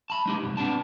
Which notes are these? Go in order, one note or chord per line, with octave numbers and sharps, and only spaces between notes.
A5 B5
G#3 D#4 G4
C2 G#2
B3 C4 D4 A5